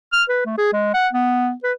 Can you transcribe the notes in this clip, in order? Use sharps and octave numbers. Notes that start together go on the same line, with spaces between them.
F6
B4
A3
G#4
G#3
F#5
B3
B4